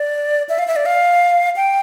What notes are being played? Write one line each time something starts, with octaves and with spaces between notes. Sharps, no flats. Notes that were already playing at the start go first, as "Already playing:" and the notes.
Already playing: D5
E5
F5
E5
D5
F5
G5